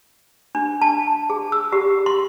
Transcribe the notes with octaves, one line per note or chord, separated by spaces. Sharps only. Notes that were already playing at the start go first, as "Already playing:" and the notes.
D4
A5
G#4
E6
G4
C6